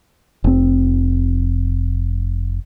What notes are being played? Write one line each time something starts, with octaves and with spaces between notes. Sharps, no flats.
F1 C4